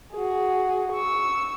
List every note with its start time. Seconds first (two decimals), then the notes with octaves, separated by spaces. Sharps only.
0.13 F#4 G#4
0.93 C#6 E6